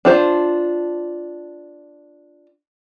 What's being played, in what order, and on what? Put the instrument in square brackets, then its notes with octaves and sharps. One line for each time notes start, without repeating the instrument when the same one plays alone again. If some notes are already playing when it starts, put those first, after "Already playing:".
[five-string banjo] D4 F4 C5